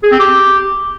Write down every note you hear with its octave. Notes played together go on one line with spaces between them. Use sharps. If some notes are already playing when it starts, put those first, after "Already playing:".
G#4
C4
G4